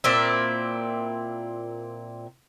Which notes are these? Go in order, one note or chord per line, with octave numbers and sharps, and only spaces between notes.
A#2 C4 E4